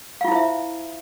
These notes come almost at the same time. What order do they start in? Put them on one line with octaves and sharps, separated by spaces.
F5 F4 E4 C5 E5